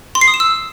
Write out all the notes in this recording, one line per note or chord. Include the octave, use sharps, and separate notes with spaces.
C6
C7
D#6
E7
E6